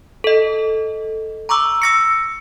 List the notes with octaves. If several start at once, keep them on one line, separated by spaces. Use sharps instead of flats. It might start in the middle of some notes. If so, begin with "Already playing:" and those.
A4 D#5
A#5 C#6 D6 E6
E6 A#6 C#7